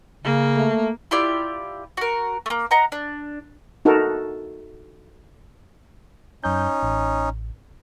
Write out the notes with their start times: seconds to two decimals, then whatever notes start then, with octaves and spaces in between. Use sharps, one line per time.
0.24 C#3 A#3
0.56 A3
1.11 E4 F4 G4 D5
1.97 F#4 A#4
2.46 A3 A#3
2.71 D#5 F#5 A#5
2.92 D4
3.85 D#4 F#4 A4 A#4
6.44 F#2 C#4 D#4 G6
6.83 A1